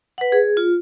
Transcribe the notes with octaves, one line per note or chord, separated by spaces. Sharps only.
B4 F#5
G#4
F4